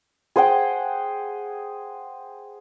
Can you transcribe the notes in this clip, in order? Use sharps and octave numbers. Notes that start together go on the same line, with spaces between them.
G#4 C5 F#5 G5